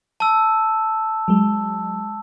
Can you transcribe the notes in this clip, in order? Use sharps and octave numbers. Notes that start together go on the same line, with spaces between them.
A5 E6
F#3 G#3